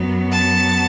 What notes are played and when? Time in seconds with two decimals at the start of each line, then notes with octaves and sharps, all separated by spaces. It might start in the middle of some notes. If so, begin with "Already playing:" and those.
Already playing: F#2 F#3 B3
0.31 A5